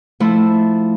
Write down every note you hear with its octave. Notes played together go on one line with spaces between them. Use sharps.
F3 A3 E4